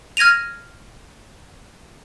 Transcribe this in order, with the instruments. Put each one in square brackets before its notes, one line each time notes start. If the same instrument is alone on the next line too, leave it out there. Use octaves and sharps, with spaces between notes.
[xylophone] F6 G#6 A#6 D#7 F7